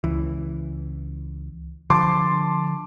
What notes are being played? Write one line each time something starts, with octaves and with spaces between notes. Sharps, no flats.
C#2 E3
D3 F3 A5 C6 D6